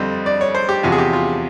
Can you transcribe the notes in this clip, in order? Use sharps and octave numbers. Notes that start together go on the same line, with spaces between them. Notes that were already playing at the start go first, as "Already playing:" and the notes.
Already playing: F2 D3 G3 C4 D#5
D5
C#5
C5
G4
E2 C3 F3 F#4
G#4
G4
F4